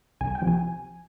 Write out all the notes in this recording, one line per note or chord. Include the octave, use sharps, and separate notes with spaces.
C2 G#5
G5
C3 F3
G#5